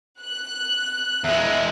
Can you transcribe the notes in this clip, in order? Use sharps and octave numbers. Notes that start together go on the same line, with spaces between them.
F#6
E2 G#3 E5